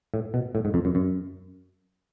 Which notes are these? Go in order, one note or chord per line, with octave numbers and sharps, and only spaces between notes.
A2
B2
A2
G#2
F2
F#2
F#2